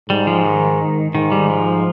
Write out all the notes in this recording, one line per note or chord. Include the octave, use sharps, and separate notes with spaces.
G#2 G3
F3
D#3
G#2 D#3
G3
F3